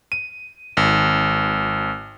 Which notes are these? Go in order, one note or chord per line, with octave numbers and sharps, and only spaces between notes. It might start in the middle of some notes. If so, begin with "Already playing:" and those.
D#7
G#1